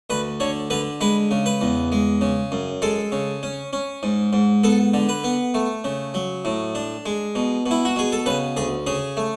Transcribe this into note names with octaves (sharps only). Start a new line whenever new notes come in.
D2 B4
D3 C#5
D3 B4
G#3 B4
C#3
B4
E2
G#3
C#3
F#2
G#3 A4
C#3
C#4
C#4
G#2
G#2
B3 A4
D3
B4
B3
A3
C#3
F#3
A2
D4
G#3
B2
B2
E4
F#4
B2 G#4
A4
C#3 B4
D2 G#4
C#3 G#4
A3